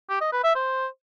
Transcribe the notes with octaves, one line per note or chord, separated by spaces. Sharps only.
G4
D#5
B4
E5
C5